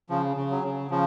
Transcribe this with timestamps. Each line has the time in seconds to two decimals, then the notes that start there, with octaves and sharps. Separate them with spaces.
0.10 C#3 F3
0.36 C#3
0.51 F#3
0.64 C#3
0.91 C#3 F3